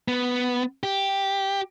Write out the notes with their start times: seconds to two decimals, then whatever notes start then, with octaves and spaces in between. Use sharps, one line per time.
0.08 B3
0.83 G4